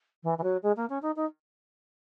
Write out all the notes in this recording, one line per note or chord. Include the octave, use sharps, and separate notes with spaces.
E3
E3
F#3
G#3
A#3
C#4
D#4
D#4